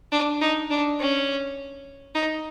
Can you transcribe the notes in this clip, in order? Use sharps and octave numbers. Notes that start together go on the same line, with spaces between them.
D4
D#4
D4
C#4
D#4